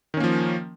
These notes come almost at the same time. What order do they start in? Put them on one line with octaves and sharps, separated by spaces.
D#3 C#4 A#3 F3